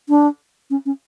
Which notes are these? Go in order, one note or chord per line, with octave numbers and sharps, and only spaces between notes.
D4
C#4
C#4